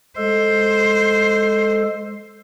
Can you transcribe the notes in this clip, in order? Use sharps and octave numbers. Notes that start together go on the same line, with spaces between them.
G#3 A4 C5